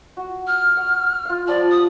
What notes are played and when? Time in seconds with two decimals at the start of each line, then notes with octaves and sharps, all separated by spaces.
0.17 F#4
0.47 F6
0.77 F#5
1.25 F4 F5
1.47 F3 G3 D5 A5
1.70 D#6